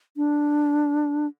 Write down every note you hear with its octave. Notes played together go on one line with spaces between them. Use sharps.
D4